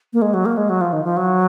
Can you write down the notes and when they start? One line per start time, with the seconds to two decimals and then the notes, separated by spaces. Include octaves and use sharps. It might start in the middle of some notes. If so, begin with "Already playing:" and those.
0.13 A#3
0.22 G#3
0.34 F#3
0.46 A#3
0.57 G#3
0.69 F#3
0.81 F3
0.93 D#3
1.04 F3
1.17 F#3